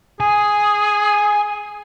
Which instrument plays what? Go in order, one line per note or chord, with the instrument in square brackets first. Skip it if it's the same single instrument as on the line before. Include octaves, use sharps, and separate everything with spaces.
[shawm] G#4 [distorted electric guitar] G#5